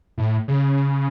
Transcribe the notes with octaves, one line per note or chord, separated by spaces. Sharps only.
A2
C#3